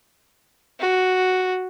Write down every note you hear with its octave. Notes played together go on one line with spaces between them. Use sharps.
F#4